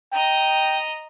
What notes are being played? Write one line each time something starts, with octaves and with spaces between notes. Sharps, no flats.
D#5 G5 A#5